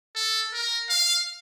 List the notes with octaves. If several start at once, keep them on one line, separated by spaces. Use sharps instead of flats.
A4
A#4
F5